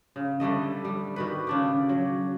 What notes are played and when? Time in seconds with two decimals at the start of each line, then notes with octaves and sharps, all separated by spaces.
0.16 C#3
0.40 D3 G3 A3 D#5
0.85 G3
1.16 D#3 F#4 B4
1.47 C#3 D4 G4
1.89 F#3